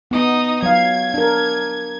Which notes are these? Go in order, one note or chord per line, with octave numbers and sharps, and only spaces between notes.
B3 D#4 D#5
F#3 F5 G#6
D4 A#4